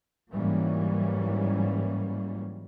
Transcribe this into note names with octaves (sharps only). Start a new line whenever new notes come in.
G#2 E3 F#3 G3 A#3 C#4